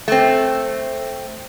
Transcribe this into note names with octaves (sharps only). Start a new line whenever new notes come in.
A3 C4